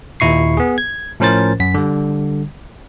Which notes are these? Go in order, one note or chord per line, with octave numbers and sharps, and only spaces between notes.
D#2 A#2 E4 C#6 C7
B3 G#4
G#6
A2 F3 C#4 A#4 C5 A6
F#2 B6
D3 G3